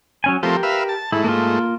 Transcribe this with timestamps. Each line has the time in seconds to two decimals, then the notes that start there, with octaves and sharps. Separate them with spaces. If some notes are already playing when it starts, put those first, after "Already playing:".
0.24 F#3 C#4 G#5
0.43 F3 A3 C4 G4 A#4
0.63 B4 E5 F5
0.89 A5
1.12 G#2 A3 E4
1.24 A#3 F4